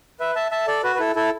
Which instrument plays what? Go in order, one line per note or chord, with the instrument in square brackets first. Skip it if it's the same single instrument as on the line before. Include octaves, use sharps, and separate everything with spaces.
[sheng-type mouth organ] B4 E5
E5 A5
E5 A5
A4 D5
F#4 B4
B4
E4 A4
E4 A4